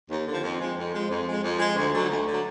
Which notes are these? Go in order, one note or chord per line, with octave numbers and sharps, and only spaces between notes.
D#2
D3 F3
F2
F3 G#3
F2
F3 G#3
F2
F3 G#3
F2
F3 G#3
D2
D3 F#3
D2
D3 F#3